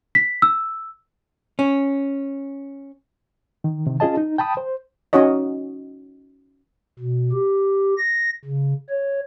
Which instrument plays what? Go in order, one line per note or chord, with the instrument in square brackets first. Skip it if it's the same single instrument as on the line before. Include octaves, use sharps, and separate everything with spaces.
[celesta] B6
E6
[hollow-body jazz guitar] C#4
[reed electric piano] D#3
C3 D#3
C#4 F4 G#4 D#5 A5
D#4
G5 A5 B5 D#6
C5
[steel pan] C#4 D#4 F#4 C#5 D#5
[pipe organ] B2
G4
A#6
C#3
C#5